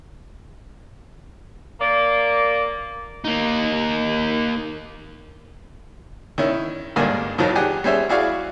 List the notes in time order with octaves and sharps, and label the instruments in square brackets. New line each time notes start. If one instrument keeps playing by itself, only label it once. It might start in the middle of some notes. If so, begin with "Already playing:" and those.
[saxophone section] A#3 D5
[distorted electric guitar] A#3 D#4
[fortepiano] D#3 C#4 E4
G#1 G2 D3 A#3 D5 G#5
F2 D#3 F3 F#3
G4 G#4 F#5 G#5
G3 C#4 G#4 C5 E5
E4 F#4 G#4 D5 F5 C#6